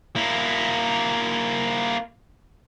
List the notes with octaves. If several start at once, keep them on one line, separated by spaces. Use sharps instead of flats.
A#3 E4